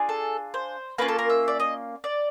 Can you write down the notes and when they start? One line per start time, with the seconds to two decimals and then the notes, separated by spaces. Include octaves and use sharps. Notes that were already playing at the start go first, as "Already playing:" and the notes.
Already playing: D4 F4 G#4
0.09 A4
0.54 C5
0.98 A#3 C#4 F4 B4
1.08 A4
1.19 A#4
1.30 E5
1.48 D5
1.60 D#5
2.04 D5